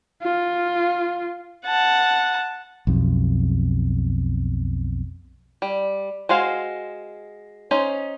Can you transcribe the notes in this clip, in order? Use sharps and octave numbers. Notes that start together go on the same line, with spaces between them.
F4
F#5 A5
B1 F2
G3
G#3 F#4 C5 F5 G#5
C#4 D#4 C5